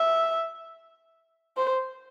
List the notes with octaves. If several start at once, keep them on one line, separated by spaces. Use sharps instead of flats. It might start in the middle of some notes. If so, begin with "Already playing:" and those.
Already playing: E5
C5